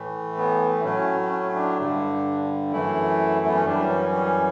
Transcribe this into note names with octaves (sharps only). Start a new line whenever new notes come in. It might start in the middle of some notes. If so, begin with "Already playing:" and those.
Already playing: A2 E3 A3
B3
A2 F#3 A3 C#4
C#4
D4
G2 D3 G3
F#2 E3 A3 E4
B3
C#4
F#2 E3 G3 D4
C#4
C#4